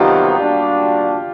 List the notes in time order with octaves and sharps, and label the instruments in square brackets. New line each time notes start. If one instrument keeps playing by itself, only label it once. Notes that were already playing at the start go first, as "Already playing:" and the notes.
Already playing: [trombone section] C3 D#3 F#3 B3 D#4 [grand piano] F4 G4
[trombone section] G3 A#3 D4 F#4